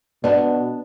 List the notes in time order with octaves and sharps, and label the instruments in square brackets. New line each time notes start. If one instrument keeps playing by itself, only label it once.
[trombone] B2 [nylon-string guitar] B3 D4 [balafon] D5